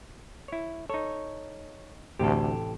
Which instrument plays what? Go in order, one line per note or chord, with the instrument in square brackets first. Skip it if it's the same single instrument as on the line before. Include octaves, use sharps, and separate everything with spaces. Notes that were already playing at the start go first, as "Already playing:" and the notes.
[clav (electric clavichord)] E4 C#5
[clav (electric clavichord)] D#4 A4 [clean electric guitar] C#5
[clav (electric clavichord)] A1 A2 C3 [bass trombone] D2 [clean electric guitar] G4 A4